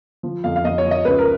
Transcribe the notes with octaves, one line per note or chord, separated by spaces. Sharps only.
F3
F2 F5
F5
F2 D#5
C#5
F3
D#5
C#2 B4
A#4